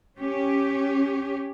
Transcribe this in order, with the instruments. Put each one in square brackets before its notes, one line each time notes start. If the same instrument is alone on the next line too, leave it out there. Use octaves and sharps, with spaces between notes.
[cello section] C#4 G4